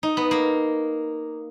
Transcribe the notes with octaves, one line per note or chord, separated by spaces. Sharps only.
D#4
B3
A#3